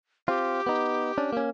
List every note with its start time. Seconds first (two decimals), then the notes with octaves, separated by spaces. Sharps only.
0.28 C4 F4 G4
0.67 B3 D#4
1.18 C#4 D4
1.33 A#3 C#4